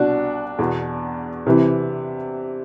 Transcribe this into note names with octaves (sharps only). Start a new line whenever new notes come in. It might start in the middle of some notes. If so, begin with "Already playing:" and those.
Already playing: C2 B2 D4 F#4
E2 B2
C3 E3